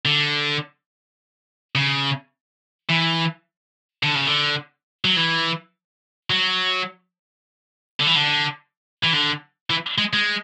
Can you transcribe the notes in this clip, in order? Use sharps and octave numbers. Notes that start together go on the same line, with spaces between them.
D3
C#3
E3
D3
C#3
D3
F#3
E3
F#3
D3
E3
D3
E3
D3
E3
G#3
G#3